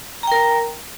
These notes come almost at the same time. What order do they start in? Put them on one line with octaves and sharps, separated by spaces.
A#5 G5 A#4